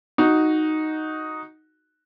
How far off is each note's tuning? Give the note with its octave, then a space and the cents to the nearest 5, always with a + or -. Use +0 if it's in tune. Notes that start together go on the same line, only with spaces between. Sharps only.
D#4 +0 F#4 +0